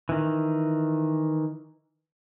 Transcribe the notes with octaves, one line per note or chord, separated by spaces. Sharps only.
D#3 E3